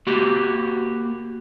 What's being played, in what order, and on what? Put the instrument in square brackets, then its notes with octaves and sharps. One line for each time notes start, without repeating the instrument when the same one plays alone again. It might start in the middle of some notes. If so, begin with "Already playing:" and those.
[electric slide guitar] A#3 F#4 G4